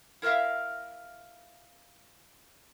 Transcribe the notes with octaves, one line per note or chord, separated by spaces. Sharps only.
E4 A#4 B4 E5 F5